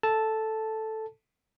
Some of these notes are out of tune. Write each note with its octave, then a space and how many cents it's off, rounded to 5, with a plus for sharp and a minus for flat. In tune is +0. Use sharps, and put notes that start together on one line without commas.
A4 +0 A5 -5